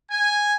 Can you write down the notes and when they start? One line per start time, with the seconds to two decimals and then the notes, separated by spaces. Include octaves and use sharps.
0.11 G#5